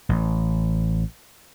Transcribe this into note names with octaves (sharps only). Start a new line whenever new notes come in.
A1